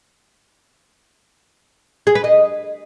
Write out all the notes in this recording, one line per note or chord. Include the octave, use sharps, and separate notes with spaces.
G#4
B4
D#5